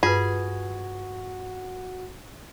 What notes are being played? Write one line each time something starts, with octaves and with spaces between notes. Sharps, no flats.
G2 F4 F#4 G#4 B4